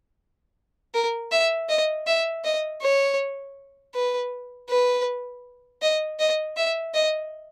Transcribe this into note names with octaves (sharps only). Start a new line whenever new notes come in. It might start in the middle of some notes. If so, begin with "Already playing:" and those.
A#4
E5
D#5
E5
D#5
C#5
B4
B4
D#5
D#5
E5
D#5